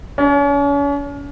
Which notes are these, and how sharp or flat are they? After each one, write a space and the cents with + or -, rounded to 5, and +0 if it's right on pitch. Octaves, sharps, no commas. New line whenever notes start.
C#4 +40